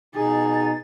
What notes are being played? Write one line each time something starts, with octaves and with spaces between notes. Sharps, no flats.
B2 D#4 G#4 A6